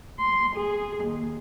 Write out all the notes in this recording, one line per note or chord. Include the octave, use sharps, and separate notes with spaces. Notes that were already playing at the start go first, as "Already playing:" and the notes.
C6
G#4
D#2